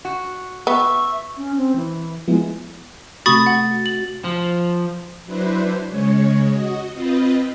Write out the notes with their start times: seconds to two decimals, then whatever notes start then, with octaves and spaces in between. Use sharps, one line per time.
0.05 F#4
0.67 B3 E5 C#6
1.37 C#4
1.57 C4
1.76 E3
2.28 F3 G#3 B3 E4
3.26 C3 A3 F#4 B5 C#6 D#6 A6
3.46 F#5
3.86 F#7
4.24 F3
5.26 F#3 D4 E4 B4 C5
5.88 C#3 G#3 C#5
6.50 F#4 D#5
6.93 C4 F4 B4 D#5